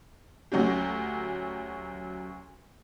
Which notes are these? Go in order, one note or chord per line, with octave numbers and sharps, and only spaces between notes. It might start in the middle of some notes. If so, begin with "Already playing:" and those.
D2 F#3 C#4 G4